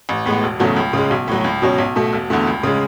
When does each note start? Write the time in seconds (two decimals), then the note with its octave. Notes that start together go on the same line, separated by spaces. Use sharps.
0.09 A1
0.26 A2 G#3 B3
0.43 E1
0.60 E2 C#3 F#3 A3
0.76 C#2
0.93 C#3 G#3
1.11 B1
1.28 A2 F#3
1.44 C#2
1.62 B2 F#3 C#4
1.78 B1
1.96 B2 A3
2.13 E1
2.30 E2 D3 A3
2.47 C#2
2.63 C#3 G#3